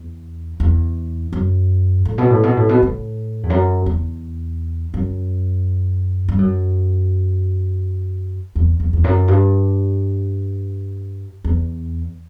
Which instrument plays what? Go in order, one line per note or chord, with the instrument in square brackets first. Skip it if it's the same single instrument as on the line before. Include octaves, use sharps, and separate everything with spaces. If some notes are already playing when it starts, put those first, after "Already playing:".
Already playing: [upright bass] E2
E2
F#2
A2
B2
A2
B2
A2
B2
A2
E2
F#2
E2
F#2
G2
F#2
E2
E2
E2
F#2
G2
E2